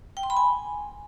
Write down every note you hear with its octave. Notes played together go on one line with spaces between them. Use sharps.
G5
C6
B5
G#5